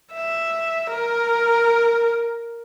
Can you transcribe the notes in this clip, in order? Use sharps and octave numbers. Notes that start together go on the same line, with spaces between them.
E5
A#4